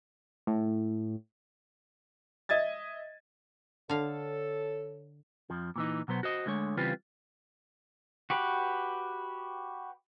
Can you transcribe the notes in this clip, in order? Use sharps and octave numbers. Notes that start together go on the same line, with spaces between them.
A2
D#5 E5 G#6 A6
D3 A4 C#5 F5
F2 F3
A#2 E3 D#4
B2 F#3 B3 C5
F#4 C5 D#5
D2 D3 G#3 C#5
C#3 E3 G3 C4 F4 B4
F#4 G4 B4